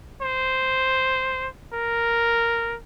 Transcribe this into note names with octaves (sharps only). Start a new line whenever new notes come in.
C5
A#4